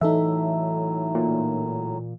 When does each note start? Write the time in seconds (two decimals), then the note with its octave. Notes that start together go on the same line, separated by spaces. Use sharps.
0.01 A2 E3 F#3 D#4 A4 E5
1.15 A#2